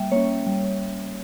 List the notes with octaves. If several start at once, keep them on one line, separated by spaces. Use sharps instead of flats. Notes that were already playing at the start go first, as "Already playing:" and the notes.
Already playing: G3 A#3 E5 G5
A#3 C#4 C#5
G3